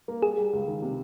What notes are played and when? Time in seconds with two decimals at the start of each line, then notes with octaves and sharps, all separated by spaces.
0.08 A#3
0.22 G3 G#4
0.38 G3
0.53 C#2
0.68 D#3
0.82 C3